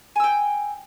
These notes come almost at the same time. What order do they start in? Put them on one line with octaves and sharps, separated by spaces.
G#5 E6 G5